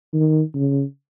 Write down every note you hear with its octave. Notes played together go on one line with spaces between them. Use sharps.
D#3
C#3